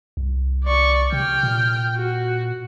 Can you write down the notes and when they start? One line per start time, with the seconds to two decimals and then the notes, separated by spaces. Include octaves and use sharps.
0.17 C2
0.64 D5 C#6
1.13 C3 G5 F6
1.43 A#2
1.97 F#4